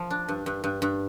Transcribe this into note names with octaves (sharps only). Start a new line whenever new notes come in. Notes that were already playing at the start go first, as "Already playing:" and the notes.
Already playing: F3
D4
G2
G2
G2
G2